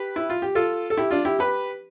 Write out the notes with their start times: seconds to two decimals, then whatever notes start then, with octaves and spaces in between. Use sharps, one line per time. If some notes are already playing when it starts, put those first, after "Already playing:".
Already playing: G4 B4
0.16 E4
0.30 F4
0.42 G4
0.55 F4 A4
0.90 A4
0.97 E4 G4
1.11 D4 F4
1.25 E4 G4
1.39 G4 B4